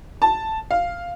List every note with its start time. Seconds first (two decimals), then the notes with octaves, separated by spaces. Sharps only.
0.22 A5
0.71 F5